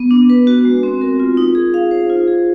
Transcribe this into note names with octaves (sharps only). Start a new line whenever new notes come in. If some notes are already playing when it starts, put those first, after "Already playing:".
Already playing: B3
D4
B4
F#4
G#3
C4
A#4
F4
D#4
G#4
F5
C5
F4
G#4